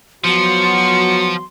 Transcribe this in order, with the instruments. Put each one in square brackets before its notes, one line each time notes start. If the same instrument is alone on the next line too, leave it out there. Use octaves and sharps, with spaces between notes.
[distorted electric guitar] F3 [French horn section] F#3 B3 F#4 [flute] C6 [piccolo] C#7